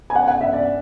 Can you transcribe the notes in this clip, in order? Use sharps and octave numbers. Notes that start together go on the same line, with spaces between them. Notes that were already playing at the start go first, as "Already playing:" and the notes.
G#5
F#5
F#5
E5
D5